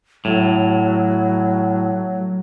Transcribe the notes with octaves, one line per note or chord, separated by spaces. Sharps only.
A2 F#3